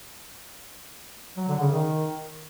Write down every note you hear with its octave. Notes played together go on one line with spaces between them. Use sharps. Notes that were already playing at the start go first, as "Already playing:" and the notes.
F#3
D3
C#3
D#3